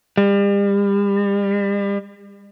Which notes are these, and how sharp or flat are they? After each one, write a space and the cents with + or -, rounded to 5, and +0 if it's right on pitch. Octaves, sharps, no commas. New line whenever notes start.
G3 +40